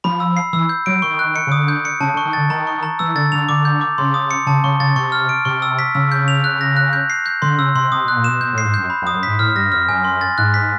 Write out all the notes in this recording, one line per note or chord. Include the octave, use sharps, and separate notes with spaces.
F3 B5
E6
C7
E3 E6
G6
F#3 D7
D#3 C#6
F#6
C#7
C#3
D3 D#6
G6
C#7
C#3 A5
D3 C#6
D#3
D3 A6
D#3 A#5
C#6
A#5
E3 E6
D3 A6
D3 F7
D3 D6
G6
D6
C#3 C6
D#6
C#7
C#3 A5
C#3 C#6
C#3 A6
C3 C#6
F6
D7
C3 C#6
E6
B6
C#3 E6
G6
F7
F#6
A#6
F#6
G6
C7
G6
D3 C6
C#3 E6
C3 C6
C3 D#6
B2 F#6
A#2
B2 E7
B2 G6
A2
C7
G#2
F#2 G6
B5
F2
D#6
F#2
G#2 B6
A2 F6
G2 A#6
F2 F6
F#2 G#5
C6
A6
G#2 F#6
B6